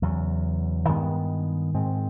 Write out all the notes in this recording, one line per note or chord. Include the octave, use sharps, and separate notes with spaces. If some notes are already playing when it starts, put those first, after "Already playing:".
E2 C#3 F#3
G2 D#3 G#3 B3
G#2 D#3 G#3 C4